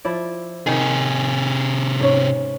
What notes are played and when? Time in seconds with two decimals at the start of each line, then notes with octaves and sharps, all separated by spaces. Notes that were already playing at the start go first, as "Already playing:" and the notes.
0.05 F3 E4 D5
0.67 C3 D#3 G#4
2.00 G#2 C#4